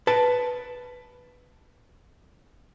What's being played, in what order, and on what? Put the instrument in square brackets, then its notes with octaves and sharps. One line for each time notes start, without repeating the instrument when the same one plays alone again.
[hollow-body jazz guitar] B4 A5